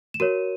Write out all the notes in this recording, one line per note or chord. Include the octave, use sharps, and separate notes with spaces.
E7
F#4 A#4 C#5 D#7